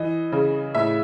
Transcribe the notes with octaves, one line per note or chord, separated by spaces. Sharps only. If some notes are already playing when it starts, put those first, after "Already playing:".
Already playing: E3 D#5
C#3
A2 E5